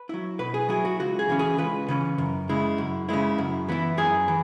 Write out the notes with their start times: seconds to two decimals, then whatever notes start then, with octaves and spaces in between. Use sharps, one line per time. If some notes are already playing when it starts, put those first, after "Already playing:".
Already playing: B4
0.09 F#3 E4
0.39 B2 B4
0.54 G#4
0.69 F#3 E4 G#4
0.85 F#4
1.00 C#2 F#4
1.19 G#4
1.29 C#3 E3 C#4
1.39 G#4
1.58 C#2 B4
1.88 C#3 E3 C#4
2.18 F#2
2.49 C#3 G#3 E4
2.78 F#2
3.09 C#3 G#3 E4
3.38 F#2
3.68 E3 B3 E4
3.97 F#2 G#4
4.28 E3